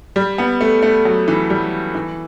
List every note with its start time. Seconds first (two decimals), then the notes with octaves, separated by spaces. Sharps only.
0.16 G3
0.38 B3
0.61 A3
0.82 A3
1.05 F#3
1.28 E3
1.50 G3
1.95 E3